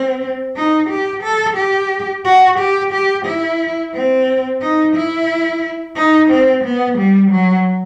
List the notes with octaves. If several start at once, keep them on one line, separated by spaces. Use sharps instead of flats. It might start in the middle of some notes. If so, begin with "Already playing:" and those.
Already playing: C4
D#4
G4
A4
G4
F#4
G4
G4
E4
C4
D#4
E4
D#4
C4
B3
G3
F#3